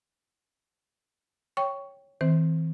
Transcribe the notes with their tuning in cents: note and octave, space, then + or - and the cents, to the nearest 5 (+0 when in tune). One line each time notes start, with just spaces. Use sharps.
C#5 +0 G5 +0 C#6 +10
E3 -40 C4 +0 C5 -5